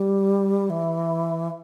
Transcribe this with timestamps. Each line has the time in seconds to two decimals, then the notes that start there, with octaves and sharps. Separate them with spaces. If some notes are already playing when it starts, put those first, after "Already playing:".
Already playing: G3
0.70 E3